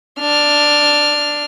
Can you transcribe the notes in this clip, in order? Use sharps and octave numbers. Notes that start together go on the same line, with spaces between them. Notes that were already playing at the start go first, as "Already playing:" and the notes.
D4 F6